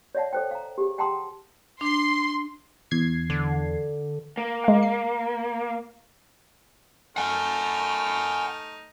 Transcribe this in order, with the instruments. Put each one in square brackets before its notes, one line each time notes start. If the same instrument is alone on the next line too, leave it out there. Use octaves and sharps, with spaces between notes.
[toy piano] C#5 D5 E5 F#5 A5
A4 C5 G5
F5 A#5
G4 G#4
F#5 G5 A5 A#5 C6 D#6
[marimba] D4 [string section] C6
[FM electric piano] E2 G#6 C7
[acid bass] D3
[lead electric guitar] A#3
[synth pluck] G#3 F5
C7
[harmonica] A3 D#4 F6 [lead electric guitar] F#5 G#5